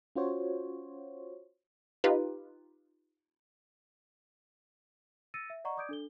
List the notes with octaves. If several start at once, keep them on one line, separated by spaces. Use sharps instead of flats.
C#4 F4 F#4 C5 C#5
D#4 F4 G4 B4
E6 A6 A#6 C#7 D#7
E5
D5 D#5 F#5 A#5 C#6
D5 D6 D#6 G6 G#6 D7
D4 A4 G7